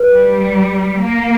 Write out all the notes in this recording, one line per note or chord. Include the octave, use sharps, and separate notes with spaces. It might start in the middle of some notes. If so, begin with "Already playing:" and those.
Already playing: B4
G3
A#3